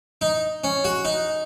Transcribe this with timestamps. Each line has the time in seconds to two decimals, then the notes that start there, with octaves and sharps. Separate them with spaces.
0.21 D#4
0.64 C#4
0.84 F#4
1.05 D#4